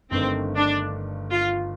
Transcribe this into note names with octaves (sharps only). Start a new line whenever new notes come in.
G1 G2 D#3 A3 C4
D4
F4